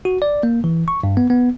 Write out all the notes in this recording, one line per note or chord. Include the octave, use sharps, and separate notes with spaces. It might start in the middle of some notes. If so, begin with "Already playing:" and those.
F#4
D5
A#3
E3
C#6
G2
B3
B3